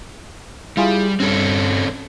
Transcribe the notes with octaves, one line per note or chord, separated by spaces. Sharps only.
G3 E4 F4 G#4
G2 C4 C#4 A4